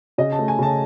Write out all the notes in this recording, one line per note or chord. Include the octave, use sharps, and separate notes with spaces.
C#3 D#5
A5
A3
G#5
C#3 A5